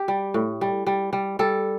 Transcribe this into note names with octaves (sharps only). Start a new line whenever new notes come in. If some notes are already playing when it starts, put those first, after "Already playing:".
Already playing: G4
G3
A2
G3
G3
G3
G3 A4